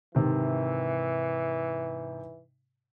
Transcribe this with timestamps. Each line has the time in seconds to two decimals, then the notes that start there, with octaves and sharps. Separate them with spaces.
0.15 G#2 C3 D#3 E3